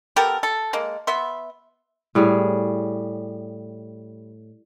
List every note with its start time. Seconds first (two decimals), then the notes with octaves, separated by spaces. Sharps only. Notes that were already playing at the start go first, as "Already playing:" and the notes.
0.16 B3 G4 A4 A#4
0.43 A4
0.73 G#3 A#3
1.07 B3 E5 C6
2.15 A2 G3 G#4 C#5